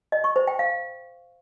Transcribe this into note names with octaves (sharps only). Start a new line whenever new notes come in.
D#5
C#6
C5
G5
F5